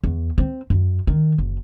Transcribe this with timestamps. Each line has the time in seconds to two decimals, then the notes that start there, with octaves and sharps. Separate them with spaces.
0.04 E2
0.38 C4
0.70 F#2
1.07 D#3
1.38 F#1